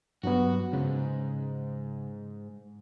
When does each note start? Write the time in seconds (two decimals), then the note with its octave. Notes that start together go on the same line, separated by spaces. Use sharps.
0.23 G2 F#3 B3 F#4
0.73 G#2 C#3